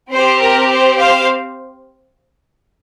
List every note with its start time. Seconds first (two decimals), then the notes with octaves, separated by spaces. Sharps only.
0.11 C4 G4 C5
0.40 A#4
0.69 C5
0.97 C5 F5